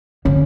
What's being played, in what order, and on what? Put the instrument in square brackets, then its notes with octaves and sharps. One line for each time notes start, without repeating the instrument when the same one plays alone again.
[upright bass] D3 [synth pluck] C#4